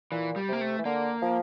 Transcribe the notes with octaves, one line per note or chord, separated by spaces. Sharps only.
A#2 E3
G3
C3 A#3
A3
E3
D3 A#3
F3